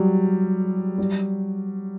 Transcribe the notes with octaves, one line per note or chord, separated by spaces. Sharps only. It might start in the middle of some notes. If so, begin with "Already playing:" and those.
Already playing: F#3 G3
G3